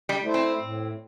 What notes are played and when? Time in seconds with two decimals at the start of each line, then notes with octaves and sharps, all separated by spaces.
0.09 G3
0.22 A3 E4 C5
0.34 C4
0.60 A2